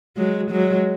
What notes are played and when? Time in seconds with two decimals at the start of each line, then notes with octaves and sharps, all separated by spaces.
0.17 F#3 G#3
0.51 F#3 G#3